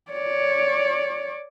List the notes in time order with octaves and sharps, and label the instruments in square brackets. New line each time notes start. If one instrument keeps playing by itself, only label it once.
[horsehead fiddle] C#5 D5